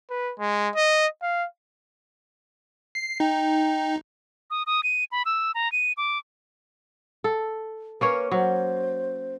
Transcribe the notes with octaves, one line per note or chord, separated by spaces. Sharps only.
B4
G#3
D#5
F5
C7
D#4 G5
D#6
D#6
D#7
B5
E6
A#5
D#7
D6
A4
A#3 C#4 B4 C#5
F#3 C5